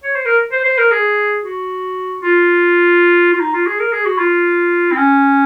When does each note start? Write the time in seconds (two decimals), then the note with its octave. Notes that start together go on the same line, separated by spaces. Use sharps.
0.04 C#5
0.15 C5
0.26 A#4
0.52 C5
0.65 C5
0.78 A#4
0.91 G#4
1.44 F#4
2.22 F4
3.33 F4
3.40 D#4
3.54 F4
3.67 G#4
3.80 A#4
3.93 G#4
4.05 F#4
4.18 F4
4.92 C4
4.97 C#4